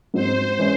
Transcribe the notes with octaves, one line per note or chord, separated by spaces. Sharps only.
G#2 F#3 C4 D#4 C5
E3 G#3 C#4 E4